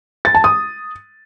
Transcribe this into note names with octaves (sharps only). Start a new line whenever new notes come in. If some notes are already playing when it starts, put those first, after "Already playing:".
A6
A5
D#6